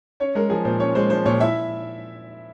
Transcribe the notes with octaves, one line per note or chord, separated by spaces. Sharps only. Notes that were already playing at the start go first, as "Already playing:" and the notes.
C#4 C#5
G#3 A#4
F3 G#4
A#2 C5
C#4 C#5
G#3 C5
F3 C5
A#2 C#5
E4 E5